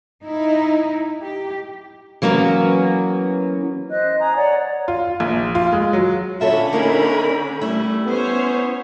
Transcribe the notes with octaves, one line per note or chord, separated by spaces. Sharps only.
D#4 E4
G4
E3 F#3 A#3 B3 C#4
C5 D#5 F#6
G#5 A#5 D#6
C#5 D5 F#5
F4
A#1
F4
G#3
F#3
D3 C#4 F4 A4 C#5 E5 B5
A#3 D#4 G#4 A#4
G3 A3 E4
B3 C#4 C5 C#5